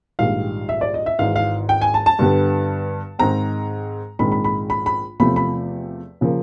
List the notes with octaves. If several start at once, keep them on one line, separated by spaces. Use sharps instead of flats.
A#1 G#2 D#3 G3 F5
E5
D5
D#5
E5
G#1 G#2 E3 F5
F5
G5
G#5
A5
A5
G2 D3 G3 B3
G#2 D#3 G#3 C4 A#5
A#1 G#2 D#3 G#3 C4 B5
B5
B5
B5
B5
E2 C3 F3 A3 B5
B5
C#3 F3 A#3